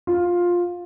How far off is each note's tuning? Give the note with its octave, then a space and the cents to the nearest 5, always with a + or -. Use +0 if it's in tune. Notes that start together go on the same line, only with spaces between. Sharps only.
F4 +10